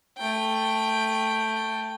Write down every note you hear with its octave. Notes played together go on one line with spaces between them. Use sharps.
A3 G5